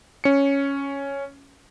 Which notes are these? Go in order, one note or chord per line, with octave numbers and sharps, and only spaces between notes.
C#4 C#7